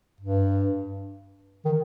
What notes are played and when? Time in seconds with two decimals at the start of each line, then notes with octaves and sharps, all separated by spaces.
0.21 G2
1.65 D#3